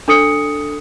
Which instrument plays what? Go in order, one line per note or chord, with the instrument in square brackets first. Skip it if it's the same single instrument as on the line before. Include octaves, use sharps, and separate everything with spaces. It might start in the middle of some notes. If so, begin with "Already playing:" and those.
[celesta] D4 A4 D#6 C#7